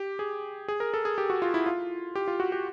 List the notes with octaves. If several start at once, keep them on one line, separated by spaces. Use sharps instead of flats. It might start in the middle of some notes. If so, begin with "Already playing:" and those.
Already playing: G4
G#4
G#4
A#4
A4
G#4
G4
F#4
F4
E4
F4
G4
F4
F#4
G4